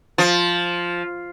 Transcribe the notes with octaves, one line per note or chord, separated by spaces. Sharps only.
F3